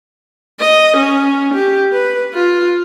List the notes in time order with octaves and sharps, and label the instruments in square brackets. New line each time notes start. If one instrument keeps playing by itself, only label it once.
[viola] D#5
C#4
G4
B4
F4